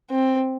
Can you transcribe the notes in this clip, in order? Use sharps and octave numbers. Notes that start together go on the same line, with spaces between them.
C4